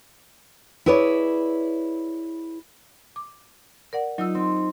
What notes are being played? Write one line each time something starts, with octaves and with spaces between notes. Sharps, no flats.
E4 G#4 B4 C#5 D5
D6
A#4 D5 F#5
F#3 D#4 F4 E6
C4